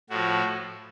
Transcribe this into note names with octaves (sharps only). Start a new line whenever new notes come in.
A2 F3 F#4